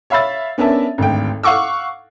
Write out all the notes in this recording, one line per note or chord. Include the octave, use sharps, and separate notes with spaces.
C#5 E5 F5 B5 E6 A6
B3 C#4 D4 A#4 E5 A5
G#1 D2 G5
F5 F#5 C#6 D6 E6